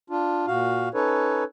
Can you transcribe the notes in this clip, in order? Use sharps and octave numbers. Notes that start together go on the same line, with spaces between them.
D4 F4
A#2 F#4 F5
C#4 D#4 A4 B4 C#5